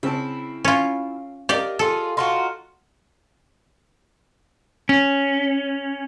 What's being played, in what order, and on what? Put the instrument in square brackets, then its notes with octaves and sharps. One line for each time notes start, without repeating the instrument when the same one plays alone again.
[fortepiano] C#3 C4 A5 [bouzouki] E4
[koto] C#4 F4
[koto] G4 D5 [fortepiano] A#4 D#5 F5
[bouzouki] F4 G#4 [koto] A4
[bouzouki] D#4 F4 F#4 [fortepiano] A5 C6 C#6
[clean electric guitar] C#4